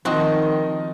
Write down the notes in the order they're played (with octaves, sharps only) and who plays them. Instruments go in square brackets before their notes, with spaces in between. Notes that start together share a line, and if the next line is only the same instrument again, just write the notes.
[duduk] D#3 [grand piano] F3 D#4 D#5 [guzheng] C4 F#4